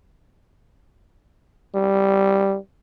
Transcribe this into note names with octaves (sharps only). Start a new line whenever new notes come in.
G3